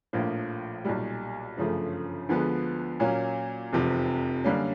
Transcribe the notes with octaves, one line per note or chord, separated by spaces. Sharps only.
A#1 A2 F3 A#3
B1 A#2 G3
G1 F#2 C#3 F3 A3
D2 D3 F3 G#3 B3
A#2 F#3 A#3 C#4
F1 E2 C3 F3
F#2 D3 G3 A#3 C#4